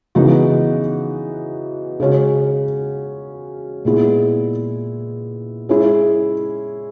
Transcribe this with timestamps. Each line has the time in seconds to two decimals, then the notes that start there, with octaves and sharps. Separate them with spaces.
0.15 C#3 E3 B3 D#4 F#4
2.00 C#3 G#3 C#4 F#4
3.85 A#2 G#3 B3 E4 G#4
5.69 G#3 C#4 E4 G#4